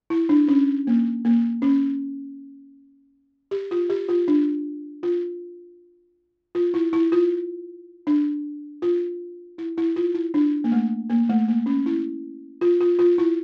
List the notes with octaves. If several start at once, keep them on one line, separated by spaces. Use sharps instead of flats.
E4
D4
C#4
A#3
A#3
C#4
G4
F4
G4
F4
D4
F4
F4
E4
E4
F4
D4
F4
E4
E4
F4
E4
D4
A#3
A3
A#3
A3
A#3
C#4
E4
F4
F4
F4
E4